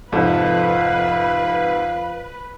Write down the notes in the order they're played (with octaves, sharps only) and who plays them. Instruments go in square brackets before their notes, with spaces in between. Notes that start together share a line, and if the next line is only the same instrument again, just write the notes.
[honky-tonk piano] F2 A4 [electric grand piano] G#2 C3 [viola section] B4 [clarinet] F5